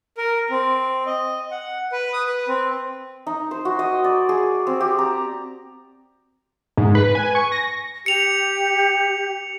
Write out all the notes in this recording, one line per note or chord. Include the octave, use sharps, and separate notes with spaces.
A#4
C4
D#5
F#5
B4
D#6
B4
C4
D#4
C5
F#4
D#5
D5
G#4
C4
G4
A#5
G#2
B4
G#5
C#6
A#6
G4 C#7 F7